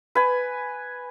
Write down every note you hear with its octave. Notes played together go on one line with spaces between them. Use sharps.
B4 G#5